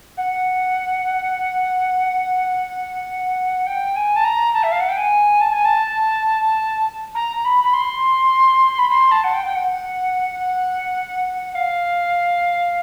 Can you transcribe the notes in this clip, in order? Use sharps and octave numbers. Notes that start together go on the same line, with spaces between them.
F#5
G5
G#5
A5
A#5
A5
E5
F5
F#5
G5
G#5
A5
G#5
A5
A#5
A#5
B5
B5
C6
B5
C6
A5
F#5
G5
G5
F#5
F#5
F5